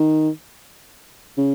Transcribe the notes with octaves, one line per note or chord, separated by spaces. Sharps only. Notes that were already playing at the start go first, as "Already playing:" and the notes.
Already playing: D#3
C#3